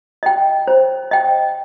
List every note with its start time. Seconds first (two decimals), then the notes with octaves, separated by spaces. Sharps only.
0.23 D#5 G5
0.68 C5
1.11 D#5 G5